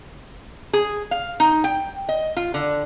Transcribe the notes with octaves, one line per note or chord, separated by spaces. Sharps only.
G#4
F5
D#4
G5
D#5
F4
D3